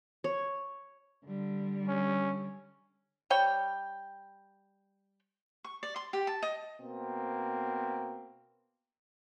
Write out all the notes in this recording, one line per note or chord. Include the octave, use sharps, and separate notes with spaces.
C#5
D3 G3
C#4
G3 C#5 G5
C#6
D5
C6
G4
A5
D#5
B2 A#3 C4